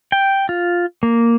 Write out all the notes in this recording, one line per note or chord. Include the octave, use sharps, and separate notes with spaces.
G5
F4
A#3